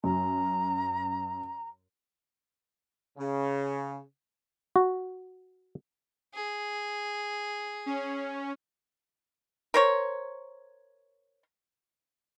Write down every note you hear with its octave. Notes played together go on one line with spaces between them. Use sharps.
F#2 A#5
C#3
F#4
G#4
C#4
A#4 C5 C#5